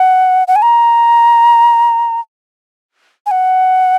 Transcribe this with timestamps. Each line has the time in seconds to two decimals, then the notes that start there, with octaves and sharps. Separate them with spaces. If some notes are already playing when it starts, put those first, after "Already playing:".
Already playing: F#5
0.48 F#5
0.56 G#5
0.62 A#5
3.26 G#5
3.31 F#5